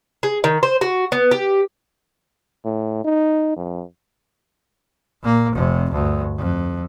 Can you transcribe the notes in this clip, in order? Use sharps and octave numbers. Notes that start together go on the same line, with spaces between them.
G#4
D#3
C5
F#4
B3
G4
A2
D#4
F2
A#2 A#3
F1 C3
D2 G2
F2